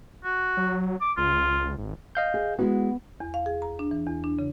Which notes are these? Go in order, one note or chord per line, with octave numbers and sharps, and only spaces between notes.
F#4
F#3
D6
C#2 F4
G#1
D#5 F5 G6
G#4
G#3 B3 E4 F#4
E2
F5
G#4
A#5
D4
E3
E2
D4
C#3